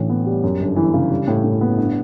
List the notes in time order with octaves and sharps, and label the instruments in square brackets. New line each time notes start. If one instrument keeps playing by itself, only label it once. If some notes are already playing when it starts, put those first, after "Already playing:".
Already playing: [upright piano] A1 A2 D3
B3
G3
F#2
G1
E3
C#3
G3
A2
A2
B3
G2